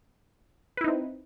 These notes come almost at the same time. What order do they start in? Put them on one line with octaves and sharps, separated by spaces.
B4 E4 D#4 C4